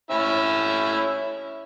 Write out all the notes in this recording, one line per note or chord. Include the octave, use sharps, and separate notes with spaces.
C#4 E4 E5